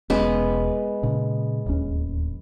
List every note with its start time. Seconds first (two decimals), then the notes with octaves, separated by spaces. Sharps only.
0.10 E1 G#3 B3 C#4
1.03 A#2 C#3
1.66 D1 D#2 C#4